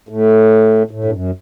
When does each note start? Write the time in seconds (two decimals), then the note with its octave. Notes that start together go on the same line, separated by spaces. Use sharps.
0.09 A2
0.91 A2
1.04 G2
1.12 F#2